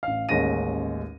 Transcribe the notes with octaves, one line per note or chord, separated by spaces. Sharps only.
A1 F5
A1 D#2 G#3 C#4 A#6 D#7